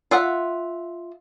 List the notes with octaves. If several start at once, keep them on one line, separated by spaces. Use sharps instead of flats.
F4 E5 F#5